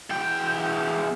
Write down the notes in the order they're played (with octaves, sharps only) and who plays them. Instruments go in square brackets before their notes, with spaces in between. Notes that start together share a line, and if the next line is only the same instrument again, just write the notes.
[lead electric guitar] E2 G5